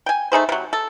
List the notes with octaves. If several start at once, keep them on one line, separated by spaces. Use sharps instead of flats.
G5 G#5
A3 D#4 G#4 C5
C3 F#3
A4